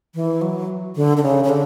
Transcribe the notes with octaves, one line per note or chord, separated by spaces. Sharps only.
E3
F#3
D3
D3
C#3
C#3
D3